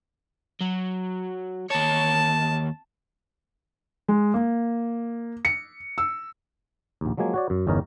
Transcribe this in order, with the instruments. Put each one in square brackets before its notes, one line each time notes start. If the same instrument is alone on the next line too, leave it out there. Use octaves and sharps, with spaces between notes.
[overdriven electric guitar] F#3
[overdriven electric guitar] D#2 C#5 [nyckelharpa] A5
[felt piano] G#3
A#3
C#7
E6
[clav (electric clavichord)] A#1 D#2
F3 F#3 G#3 A#3 G#5
F#4 C#5 D5
F#2
G1 E2 C#4 D#4 A#4